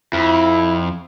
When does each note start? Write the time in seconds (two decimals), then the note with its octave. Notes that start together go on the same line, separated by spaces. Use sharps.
0.13 F2 E4